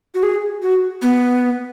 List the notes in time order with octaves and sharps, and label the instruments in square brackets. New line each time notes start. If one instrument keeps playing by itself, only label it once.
[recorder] F#4
G#4
F#4
B3